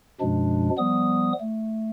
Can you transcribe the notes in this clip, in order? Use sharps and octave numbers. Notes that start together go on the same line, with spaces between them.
F#2 B2 F3 G#3 D4
F3 G3 B3 D#6
A3